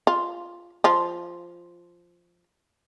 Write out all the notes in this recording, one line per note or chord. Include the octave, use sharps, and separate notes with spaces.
F4
F3 F4